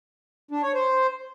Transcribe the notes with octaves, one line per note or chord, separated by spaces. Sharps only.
D4
C#5
C5